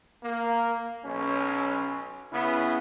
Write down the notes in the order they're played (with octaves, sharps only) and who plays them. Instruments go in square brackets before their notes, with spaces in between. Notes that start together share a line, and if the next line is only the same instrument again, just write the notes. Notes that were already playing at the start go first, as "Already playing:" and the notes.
[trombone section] A#3
B1 C#4
C#3 B3 E4